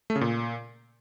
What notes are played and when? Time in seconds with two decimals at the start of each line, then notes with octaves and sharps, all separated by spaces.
0.10 A3
0.16 C#3
0.21 A#2